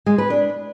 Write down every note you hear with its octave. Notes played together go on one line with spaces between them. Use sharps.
G#3
B4
D4